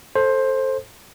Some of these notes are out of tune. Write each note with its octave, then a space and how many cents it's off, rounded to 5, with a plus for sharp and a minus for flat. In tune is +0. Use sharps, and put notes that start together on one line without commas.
A4 +0 C5 +15